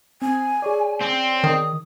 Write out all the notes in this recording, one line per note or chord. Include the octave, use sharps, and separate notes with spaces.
C4 G#5
G#4 C#5 D5
C4
D#3 D#6